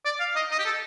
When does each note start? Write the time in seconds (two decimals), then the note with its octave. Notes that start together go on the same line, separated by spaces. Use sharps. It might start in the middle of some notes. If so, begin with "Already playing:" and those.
0.05 D5
0.20 F5
0.36 D#5
0.51 D#5
0.59 G4
0.66 A4